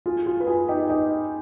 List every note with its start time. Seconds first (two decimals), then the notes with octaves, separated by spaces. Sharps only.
0.06 F4 G#4
0.26 F4 G#4
0.40 B4
0.47 F4 G#4
0.68 D#4 G4
0.89 D#4 G4